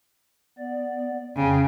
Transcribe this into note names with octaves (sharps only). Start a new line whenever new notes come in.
B3 D5
F2 C#3 G5 G#5